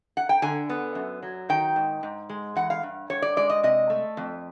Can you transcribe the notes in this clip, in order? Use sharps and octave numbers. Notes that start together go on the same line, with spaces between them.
F#5
G5
D3 G#5
B3
F#2
F#3
D#3 G5
G#2
G#2
G#3
E3 F#5
F5
G2
G2 C#5
D5
G#3 D5
D#5
C3 D#5
A3
F2